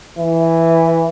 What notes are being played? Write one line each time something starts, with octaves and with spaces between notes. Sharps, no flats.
E3